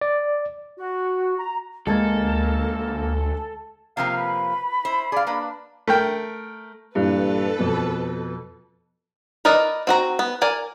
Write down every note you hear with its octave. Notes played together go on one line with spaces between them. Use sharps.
D5
F#4
A#5
D2 G#3 A#3 A4 G#6 A6
C3 F3 A#3 F5
B4 B5
E4 C5
G#4 D5 F5
A#3 D4 B4
A3 A#4 G5
G2 A#2 E3 A4 B4
F2 B2
A#4 B4 D5 D#5
C4 F#4 A#5
B3
A#4 D5 G#5